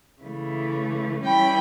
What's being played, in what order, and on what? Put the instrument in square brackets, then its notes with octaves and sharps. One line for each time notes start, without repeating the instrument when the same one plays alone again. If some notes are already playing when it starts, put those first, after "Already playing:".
[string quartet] C#3 E3 A3
E3 G3 C#4 E4 G5 B5